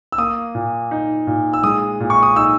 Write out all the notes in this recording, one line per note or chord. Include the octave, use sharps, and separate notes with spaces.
E6
A#3 D#6
A#2
D#4
A#2
E6
G#3 D#6
A#2
C#6
D#6
D#4 E6